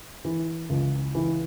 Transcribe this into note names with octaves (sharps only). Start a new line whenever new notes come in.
E3
C#2
E3